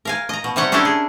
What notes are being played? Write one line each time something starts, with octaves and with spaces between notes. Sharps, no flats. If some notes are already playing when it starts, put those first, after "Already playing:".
A#4 F5 G#5
D#5 A#5
B2
C3 G3 C#5 F#5 G5
C#4 D4 E4 G4 A4 A#4
G#4